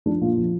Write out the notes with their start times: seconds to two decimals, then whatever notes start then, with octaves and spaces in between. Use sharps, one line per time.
0.06 F3 D4
0.21 A#2 F4
0.38 F3